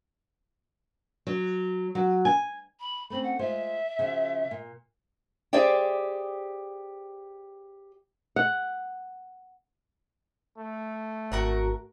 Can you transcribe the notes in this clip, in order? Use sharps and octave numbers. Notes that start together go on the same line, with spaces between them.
F#3
F#3
G#5
B5
A3 C4 C#4 B5
F#5
G#3 F4 C5 E5
C#3 F3 F#4
A#2
G4 G#4 C5 D5 E5 G5
F#5
A3
G#1 F#4 A#4 F#5